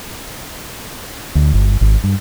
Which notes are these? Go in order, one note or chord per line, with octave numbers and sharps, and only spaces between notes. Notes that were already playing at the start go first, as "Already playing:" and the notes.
D2
G1
G#1
G2